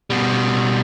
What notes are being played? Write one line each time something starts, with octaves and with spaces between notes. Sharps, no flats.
B2 G3